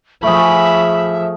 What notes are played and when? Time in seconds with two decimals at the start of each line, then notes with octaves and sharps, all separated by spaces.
0.23 F3 A3 G#4 E5 B5